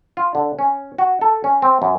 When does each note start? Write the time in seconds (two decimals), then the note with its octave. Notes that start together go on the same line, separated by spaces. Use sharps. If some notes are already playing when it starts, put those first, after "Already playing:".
0.17 F4
0.35 D3
0.59 C#4
0.98 F#4
1.21 A4
1.44 C#4
1.62 C4
1.82 F#2